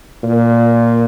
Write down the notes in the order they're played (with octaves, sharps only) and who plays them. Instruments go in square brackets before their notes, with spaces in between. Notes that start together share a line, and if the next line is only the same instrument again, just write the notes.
[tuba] A#2